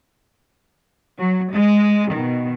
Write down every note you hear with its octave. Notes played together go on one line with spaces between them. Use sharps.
F#3
G#3
B2 D#3